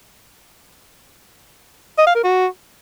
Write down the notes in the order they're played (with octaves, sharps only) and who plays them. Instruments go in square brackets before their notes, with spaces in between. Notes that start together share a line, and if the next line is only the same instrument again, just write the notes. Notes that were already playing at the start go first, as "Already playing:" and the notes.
[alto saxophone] D#5
F5
A#4
F#4